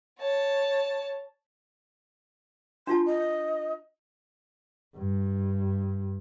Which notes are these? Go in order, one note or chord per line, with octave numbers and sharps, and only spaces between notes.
C#5 A5
D4 F4 A5 C6
D#5
G2